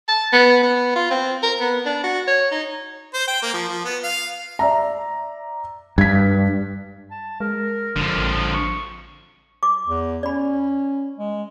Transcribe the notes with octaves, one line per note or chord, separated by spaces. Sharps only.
A5
B3
B3
F4
C4
A#4
B3
D4
F#4
C#5
D#4
C5
G5
A#3
F3
F3
B3
F5
D5 E5 A#5
G2 G#6 B6
A5
G#3 A#4
F#1 D3 F3
A1 C4
C#6
D6
E2
C#4 D5 B5
G#3